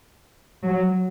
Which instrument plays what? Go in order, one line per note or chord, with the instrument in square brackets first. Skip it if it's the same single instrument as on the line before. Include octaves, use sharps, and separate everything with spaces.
[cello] F#3